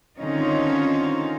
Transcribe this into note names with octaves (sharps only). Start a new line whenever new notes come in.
D3 D#3 C4 C#4 D#4 F4